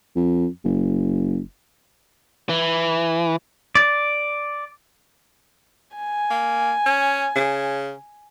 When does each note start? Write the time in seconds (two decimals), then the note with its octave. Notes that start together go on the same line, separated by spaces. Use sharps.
0.16 F2
0.65 F#1
2.49 E3
3.75 D5
5.96 G#5
6.31 A#3
6.86 C#4
7.36 C#3